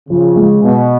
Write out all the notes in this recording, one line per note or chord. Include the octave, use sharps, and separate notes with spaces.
C#3 F3
G#3
B2 B3